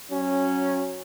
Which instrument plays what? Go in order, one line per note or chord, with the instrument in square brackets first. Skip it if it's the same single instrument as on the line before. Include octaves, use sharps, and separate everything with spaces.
[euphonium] F#3 [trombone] C#4